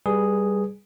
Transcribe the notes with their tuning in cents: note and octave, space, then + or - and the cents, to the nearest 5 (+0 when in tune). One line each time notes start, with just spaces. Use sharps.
G3 +10 G#4 +0 B4 -15